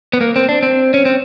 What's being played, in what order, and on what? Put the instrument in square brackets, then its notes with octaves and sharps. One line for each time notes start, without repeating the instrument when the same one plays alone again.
[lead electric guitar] B3
A#3
C4
D4
C4
C#4
C4